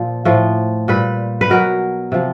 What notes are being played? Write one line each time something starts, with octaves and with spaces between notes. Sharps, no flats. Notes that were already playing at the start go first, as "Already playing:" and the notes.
Already playing: A#2 F3
A2 F3
A#2 G3 B4
B4
B2 F#3 A#4
C3 F3